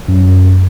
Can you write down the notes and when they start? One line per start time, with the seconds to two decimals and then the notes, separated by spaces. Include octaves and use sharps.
0.08 F#2